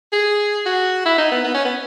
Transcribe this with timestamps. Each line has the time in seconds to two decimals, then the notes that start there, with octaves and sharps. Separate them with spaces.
0.13 G#4
0.66 F#4
1.05 E4
1.18 D#4
1.31 B3
1.44 B3
1.54 C#4
1.65 B3